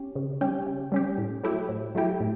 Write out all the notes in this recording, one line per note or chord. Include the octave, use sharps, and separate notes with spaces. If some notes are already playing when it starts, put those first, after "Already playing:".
Already playing: C#4 G4
C#3
G3 C#4 G4
C#3
G3 C#4 G4
A2
F#3 A3 E4 G4
A2
F#3 A3 E4 G4
A2